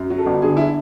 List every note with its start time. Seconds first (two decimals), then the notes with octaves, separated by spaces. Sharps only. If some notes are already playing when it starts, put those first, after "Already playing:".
Already playing: F#2
0.10 F#3
0.18 A4
0.26 G1
0.42 D3 G#4
0.57 E4